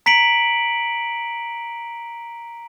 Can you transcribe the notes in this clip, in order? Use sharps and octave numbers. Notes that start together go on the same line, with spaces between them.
A#5 B6 C#7 D7 F#7